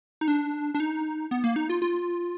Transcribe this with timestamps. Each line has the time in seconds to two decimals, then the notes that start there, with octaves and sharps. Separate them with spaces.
0.21 D#4
0.28 D4
0.75 D4
0.80 D#4
1.31 B3
1.44 A#3
1.56 D#4
1.69 F4
1.82 F4